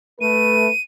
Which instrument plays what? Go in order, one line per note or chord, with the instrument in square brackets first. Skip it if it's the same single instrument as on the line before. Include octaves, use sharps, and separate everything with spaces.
[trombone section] A3 B4 [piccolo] D#7